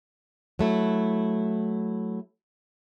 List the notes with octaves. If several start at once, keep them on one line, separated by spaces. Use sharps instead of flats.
F#3 A3 E4